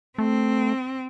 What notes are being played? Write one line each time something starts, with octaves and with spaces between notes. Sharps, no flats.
A3 C4